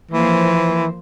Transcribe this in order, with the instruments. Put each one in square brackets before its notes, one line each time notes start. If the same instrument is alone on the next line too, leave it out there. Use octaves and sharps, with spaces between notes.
[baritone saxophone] E3 [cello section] F3 A#3 C5